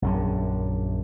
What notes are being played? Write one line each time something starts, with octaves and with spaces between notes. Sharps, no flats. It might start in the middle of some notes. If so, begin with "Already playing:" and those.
A#1 F#2 D3